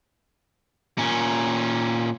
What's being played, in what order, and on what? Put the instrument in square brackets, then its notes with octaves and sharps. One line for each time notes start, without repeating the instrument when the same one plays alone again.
[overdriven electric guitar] A#2 C#4